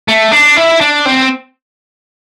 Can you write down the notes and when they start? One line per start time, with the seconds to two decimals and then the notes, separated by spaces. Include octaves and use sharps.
0.08 A3
0.32 D4
0.57 E4
0.81 D4
1.06 C4